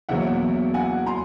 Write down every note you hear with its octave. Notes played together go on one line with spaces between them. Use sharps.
E2 B2 F#3 A#3 E5 F#5
F#5 G#5
A#5 C6